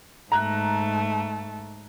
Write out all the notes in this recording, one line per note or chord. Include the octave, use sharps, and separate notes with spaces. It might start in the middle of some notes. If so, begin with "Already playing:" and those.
G#2 A3 A#5 F#6